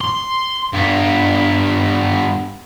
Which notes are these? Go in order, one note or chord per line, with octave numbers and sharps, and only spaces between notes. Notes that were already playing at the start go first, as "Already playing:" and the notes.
C6
G2 B3